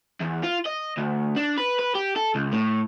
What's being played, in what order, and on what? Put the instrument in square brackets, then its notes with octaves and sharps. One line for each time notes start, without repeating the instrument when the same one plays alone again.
[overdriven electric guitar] E2
F4
D#5
D2
D4
B4
B4
G4
A4
C#2
A2